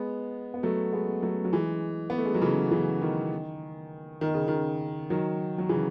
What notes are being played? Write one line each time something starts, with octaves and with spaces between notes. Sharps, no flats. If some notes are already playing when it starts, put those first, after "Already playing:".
Already playing: G#3 B3
B3
F#3 A3
G#3 B3
F#3 A3
F#3
E3 G#3
B3
A3
G#3
F#3
C#3 E3
C#3 E3
D#3
D#3
C#3
D#3
D#3 F#3
F#3
C#3 E3